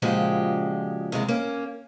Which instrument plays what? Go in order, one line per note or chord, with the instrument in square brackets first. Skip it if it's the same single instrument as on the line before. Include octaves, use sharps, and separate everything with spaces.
[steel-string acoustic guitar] A#2 C#3 F3 G#3 F#4 G4
D#2 C3 G#3 E4
A#3 C#4